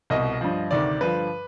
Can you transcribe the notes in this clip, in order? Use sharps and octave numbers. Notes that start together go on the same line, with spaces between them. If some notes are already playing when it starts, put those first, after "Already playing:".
C2 B2 D#5
G2 F3
D2 C3 D#3 D5
G2 D3 F3 B4